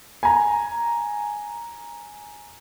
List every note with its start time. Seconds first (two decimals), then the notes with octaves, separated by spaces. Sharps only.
0.23 G#5 A#5